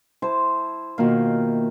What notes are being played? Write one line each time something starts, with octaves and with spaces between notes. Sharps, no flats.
E4 C5 A5
B2 D#3 A#3 F4 G4